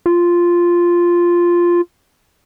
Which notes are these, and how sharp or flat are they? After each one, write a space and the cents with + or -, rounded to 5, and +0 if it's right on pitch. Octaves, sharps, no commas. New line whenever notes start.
F4 -5